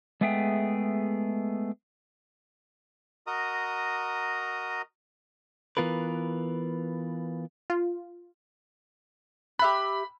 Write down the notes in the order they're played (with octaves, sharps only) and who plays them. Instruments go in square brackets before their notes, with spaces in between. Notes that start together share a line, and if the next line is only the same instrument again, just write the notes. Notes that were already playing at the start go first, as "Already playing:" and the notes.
[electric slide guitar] G#3 A3 B3 G#4 E5 G5
[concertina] F#4 A#4 D#5 A#5 D#6
[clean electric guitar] E3 B3 F4 A#4 B4
[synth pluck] F4
[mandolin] G4 E5 F#6 [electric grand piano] B5